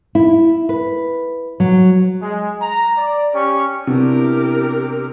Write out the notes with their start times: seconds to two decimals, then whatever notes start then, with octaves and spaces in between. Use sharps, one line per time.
0.15 E4
0.69 B4
1.60 F#3
2.21 G#3
2.61 A#5
2.98 D5
3.33 C#4 G4 C#6
3.87 C3 B3 D4 E4 G4 A#4